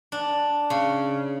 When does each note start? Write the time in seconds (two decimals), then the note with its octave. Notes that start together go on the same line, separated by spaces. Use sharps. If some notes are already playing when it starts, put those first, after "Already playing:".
0.12 D4
0.70 C#3